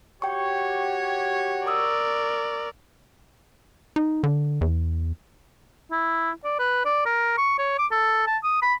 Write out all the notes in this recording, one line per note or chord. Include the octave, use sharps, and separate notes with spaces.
F#4 G4 C#5 G5 C#6
A#4 D5 C#6 D#6 E6
D#4
D3
E2
E4
D5
B4
D5
A#4
C#6
C#5
D6
A4
A5
D#6
B5